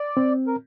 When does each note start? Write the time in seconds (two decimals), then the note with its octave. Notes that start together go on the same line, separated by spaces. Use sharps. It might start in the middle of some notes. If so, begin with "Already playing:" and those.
Already playing: D5
0.17 C4
0.47 A#4